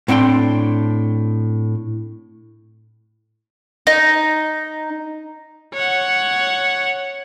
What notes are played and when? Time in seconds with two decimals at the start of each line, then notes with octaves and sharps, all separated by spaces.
0.08 A2 C4 D4 G5 C6
3.87 D#4
5.74 C#5 F#5